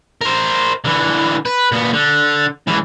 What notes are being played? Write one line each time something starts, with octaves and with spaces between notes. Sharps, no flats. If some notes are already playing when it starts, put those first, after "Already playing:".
A#4 C5
D3 E3
B4
A#2 B3
D3
C#2 E3